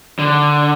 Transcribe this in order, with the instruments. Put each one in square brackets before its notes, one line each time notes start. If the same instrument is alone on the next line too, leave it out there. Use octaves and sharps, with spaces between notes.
[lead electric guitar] D3